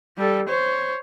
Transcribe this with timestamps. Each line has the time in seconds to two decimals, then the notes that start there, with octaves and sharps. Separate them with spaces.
0.18 G3 A4
0.48 C5 C#5